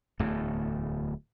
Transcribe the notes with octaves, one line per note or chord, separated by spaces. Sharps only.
D1 E2 A2 A3